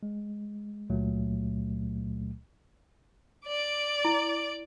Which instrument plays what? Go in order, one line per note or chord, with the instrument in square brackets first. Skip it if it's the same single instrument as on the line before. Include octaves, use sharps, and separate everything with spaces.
[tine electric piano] G#3
C#2 A#2 F#3 A3
[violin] D5 D6
[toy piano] E4